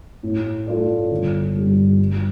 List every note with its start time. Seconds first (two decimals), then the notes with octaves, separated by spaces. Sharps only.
0.23 A2
0.67 A3 F4 A4 D5
1.11 G1
1.55 G2 G3
1.99 G2